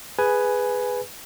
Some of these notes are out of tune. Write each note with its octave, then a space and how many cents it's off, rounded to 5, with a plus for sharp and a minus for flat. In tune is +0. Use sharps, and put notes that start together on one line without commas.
G#4 -5 B4 +0 G#5 +5